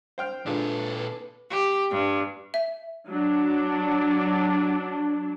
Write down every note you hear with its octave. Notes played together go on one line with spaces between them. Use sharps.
C5 G5 F6
A#2 D4 F4 G#4 A4 B4
G4
G2
E5
F#3 D4